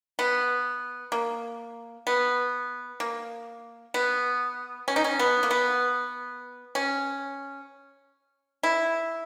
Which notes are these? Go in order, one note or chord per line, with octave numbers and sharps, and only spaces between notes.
B3
A#3
B3
A#3
B3
C#4
D#4
C#4
B3
A#3
B3
C#4
E4